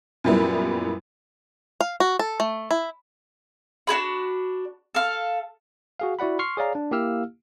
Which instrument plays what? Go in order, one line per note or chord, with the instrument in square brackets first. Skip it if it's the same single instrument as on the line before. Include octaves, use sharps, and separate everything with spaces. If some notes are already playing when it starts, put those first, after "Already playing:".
[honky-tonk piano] F#2 A#2 G3 B3 E4
[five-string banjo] F5
F#4
A4
A3
E4
[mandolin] D4 F#4 G#4 B5
A4 F5
[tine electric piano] F#4 G#4 F5
E4 F#4 D5 F#5 B5
C6 C#6 F6 C7
G#4 C#5 D5 F5 A#5
D4
A#3 E4 G4 F5 E6 F6